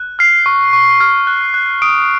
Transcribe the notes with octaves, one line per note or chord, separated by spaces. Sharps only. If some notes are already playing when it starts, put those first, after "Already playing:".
Already playing: F#6
F6 C7
C#6
C#6
F6
F#6
F#6
D#6 D7